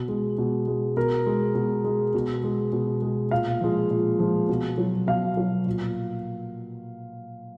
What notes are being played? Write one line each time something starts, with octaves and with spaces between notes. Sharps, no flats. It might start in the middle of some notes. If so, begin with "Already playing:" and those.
Already playing: B2
G#3
B2
G#3
B2 A#4
G#3
B2
G#3
B2
G#3
B2
G#3
A#2 F5
F3 G#3
A#2
F3 G#3
B2
F#3
B2 F5
F#3
A#2